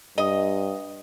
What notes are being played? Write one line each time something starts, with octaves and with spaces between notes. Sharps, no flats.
G2 D#5